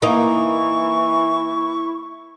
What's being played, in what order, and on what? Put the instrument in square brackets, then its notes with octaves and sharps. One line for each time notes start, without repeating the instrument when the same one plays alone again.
[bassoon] E3 [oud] A#3 D#4 [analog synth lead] E4 [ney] C#6